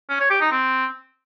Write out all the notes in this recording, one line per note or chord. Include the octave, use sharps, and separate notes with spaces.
C#4
C#5
G4
D#4
C4